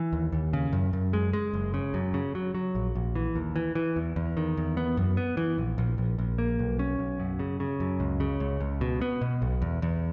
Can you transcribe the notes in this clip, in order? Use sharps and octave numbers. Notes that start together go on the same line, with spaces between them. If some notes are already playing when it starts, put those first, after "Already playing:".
Already playing: E3
D#2
D#2
C#3
F#2
F#2
G#3
G#3
F#1
C#3
F#2
C#3
F#3
F#3
A#1
A#1
E3
D#2
E3
E3
E2
E2
D#3
E2
B3
F#2
B3
E3
A#1
A#1
A#1
A#1
A#3
B1
C#4
B1
F#2
C#3
C#3
F#2
C#2
C#3
C#2
C#2
B2
B3
B2
B1
E2
E2